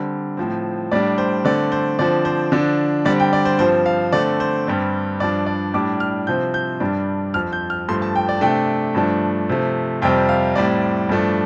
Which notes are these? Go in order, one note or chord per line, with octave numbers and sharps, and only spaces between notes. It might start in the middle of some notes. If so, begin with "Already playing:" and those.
Already playing: D3 G3 C4
A2 F3 C4
A2 G3 D4 D5
C5
D3 A3 C4 D5
C5
D3 F3 C4 D5
C5
D3 F3 D4
D3 G3 C4 D5
G5
D5
C5
G2 F3 C4 C5
F5
D3 A3 C4 D5
C5
G2 G3 C4
G2 F3 D4 D5
D5
A2 G3 D4 D6
F6
C3 F3 C4 G6
G6
G2 G3 D4
F2 F3 C4 F6
G6
F6
G2 F3 A3 C6
A5
G5
D5
C3 A3 D4 G5
G2 F3 A3 D4
C3 F3 A3
F2 C3 G3 C4 G5
F5
A2 G3 C4 D5
G2 F3 A3 D4